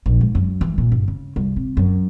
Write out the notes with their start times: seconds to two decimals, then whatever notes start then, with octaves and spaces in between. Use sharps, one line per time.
0.06 A#1
0.21 G#2
0.35 F#2
0.61 E3
0.78 A#2
0.92 G1
1.08 C#3
1.36 C2
1.56 C3
1.77 F#2